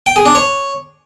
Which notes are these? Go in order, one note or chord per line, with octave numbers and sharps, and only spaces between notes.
G5
G#4
D4
C#5